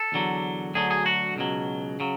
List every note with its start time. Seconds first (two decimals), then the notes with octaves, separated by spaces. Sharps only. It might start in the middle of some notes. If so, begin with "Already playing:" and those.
Already playing: A4
0.12 E2 D3 F#3
0.74 D2 D3 F#3 G#4
0.91 G#4
1.06 F#4
1.36 C#2 B2 F#3
2.00 C#3 F#3